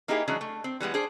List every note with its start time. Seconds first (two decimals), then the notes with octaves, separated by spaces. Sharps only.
0.08 A#3 D#4 E4 G4 G#4
0.28 E3 F#3 G#3 C#4 D4
0.41 A3
0.64 C4
0.80 E3 G3 G#3 B3
0.94 D4 G#4 C5